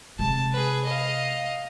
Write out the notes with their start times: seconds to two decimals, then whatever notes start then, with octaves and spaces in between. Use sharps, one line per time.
0.19 C3 G#3 A5
0.52 G#4 B4
0.84 D#5 F5